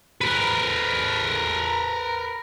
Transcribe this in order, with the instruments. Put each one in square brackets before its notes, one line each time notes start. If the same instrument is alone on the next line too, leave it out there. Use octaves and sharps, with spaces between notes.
[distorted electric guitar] A#4 B4